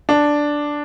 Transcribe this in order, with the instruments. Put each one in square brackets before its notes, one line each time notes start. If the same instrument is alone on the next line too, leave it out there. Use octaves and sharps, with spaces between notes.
[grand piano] D4